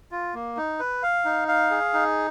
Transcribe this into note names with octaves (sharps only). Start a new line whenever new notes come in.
F4
A#3
D#4
B4
F5
D#4
F5
G#4
D#4